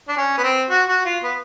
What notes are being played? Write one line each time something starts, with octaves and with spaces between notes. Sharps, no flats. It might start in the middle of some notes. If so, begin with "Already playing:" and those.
D4
C#4
B3
C4
F#4
F#4
F4
B3